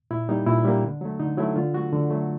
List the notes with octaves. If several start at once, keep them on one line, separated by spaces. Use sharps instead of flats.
A#2 E4
G3 A#3 D#4
A#2 E4
G3 A#3 D4
D3
F#3 A3
D3 D#4
F#3 A3 E4
D3 F4
F#3 A3 F#4
D3
F#3 A3